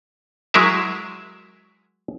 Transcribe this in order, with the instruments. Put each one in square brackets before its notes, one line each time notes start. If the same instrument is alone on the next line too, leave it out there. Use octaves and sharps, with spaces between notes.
[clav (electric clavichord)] F#3 G#3 E4 G#4 A#4 E5